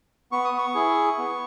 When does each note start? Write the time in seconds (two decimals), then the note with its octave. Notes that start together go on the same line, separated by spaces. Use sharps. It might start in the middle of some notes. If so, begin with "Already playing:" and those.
0.32 B3 C#6
0.45 D#6
0.58 C#6
0.75 E4 G#4
1.18 B3